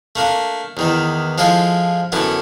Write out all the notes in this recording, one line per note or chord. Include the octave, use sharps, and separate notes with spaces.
A3 A#3 D4
E2 D#3 E3
F3 G#3 E4 F4 A4
F#2 D3 B3 E4